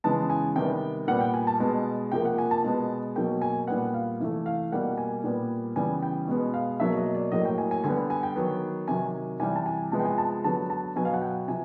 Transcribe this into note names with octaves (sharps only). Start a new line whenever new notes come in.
C#3 E3 G#3 B3 A5
G#5
C3 D#3 G3 B3 G5
A#2 G3 B3 F#5
G5
G#5
A5
B2 G#3 B3
C3 F3 A#3 G5
F#5
G#5
A5
B2 G#3 B3
B2 F#3 A#3 G5
G#5
A#2 G3 B3 F#5
F5
C3 E3 A3
F5
B2 G3 A#3 F#5
G#5
A#2 G3 B3
C#3 E3 G3 B3 G#5
G5
B2 G#3 B3
F5
B2 F#3 A#3 E5
D#5
D5
A2 F#3 A#3 D#5
G5
G#5
G#5
D3 G3 B3 G#5
G#5
G5
D#3 F#3 B3
C3 D#3 F#3 G#5
C3 E3 G3 G#5
A5
G#5
C3 F3 G#3 B3 A5
G5
G#5
A5
D3 F#3 B3 A5
A5
B2 F#3 B3 G#5
F5
F#5
G5
C3 F3 G#5